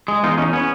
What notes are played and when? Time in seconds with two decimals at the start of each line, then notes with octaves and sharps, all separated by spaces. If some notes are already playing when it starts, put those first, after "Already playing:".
0.08 G#3
0.23 E2 D#4 F4
0.38 E2 C#4 D#4
0.53 B3 C#4